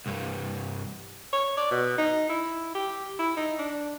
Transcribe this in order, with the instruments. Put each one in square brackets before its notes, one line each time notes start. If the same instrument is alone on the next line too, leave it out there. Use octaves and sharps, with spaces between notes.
[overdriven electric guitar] C2 G2
[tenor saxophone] C#5
D5
B2
D#4
E4
G4
E4
D#4
D4